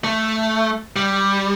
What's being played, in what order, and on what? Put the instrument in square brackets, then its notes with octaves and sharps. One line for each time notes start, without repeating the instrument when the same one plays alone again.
[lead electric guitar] A3
G3